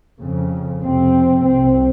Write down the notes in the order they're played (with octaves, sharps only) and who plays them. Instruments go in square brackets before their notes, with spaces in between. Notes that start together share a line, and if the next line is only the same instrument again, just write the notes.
[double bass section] F2 C#3
F2 C3 C4
C2 C3 C4